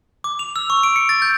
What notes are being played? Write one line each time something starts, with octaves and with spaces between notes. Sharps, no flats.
D6
F7
E6
C#6
D7
C#7
A6
G6